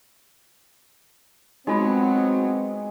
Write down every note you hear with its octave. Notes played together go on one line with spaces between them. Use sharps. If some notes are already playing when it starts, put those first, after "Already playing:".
F#3 G#3 B3 C4 D#4 F4 B5